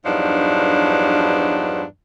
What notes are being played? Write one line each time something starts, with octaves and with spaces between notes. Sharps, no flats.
E2 G2 F3 F#3 D4 D#4